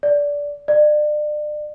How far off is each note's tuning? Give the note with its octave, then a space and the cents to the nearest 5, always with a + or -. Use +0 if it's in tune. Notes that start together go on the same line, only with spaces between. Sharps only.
D5 -15
D5 +35